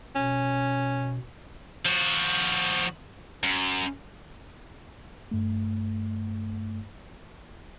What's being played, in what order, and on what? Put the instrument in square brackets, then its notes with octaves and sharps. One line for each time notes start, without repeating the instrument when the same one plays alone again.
[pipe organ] B2 [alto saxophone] C#4
[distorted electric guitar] F3 F#4
F#2
[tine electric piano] G2 A3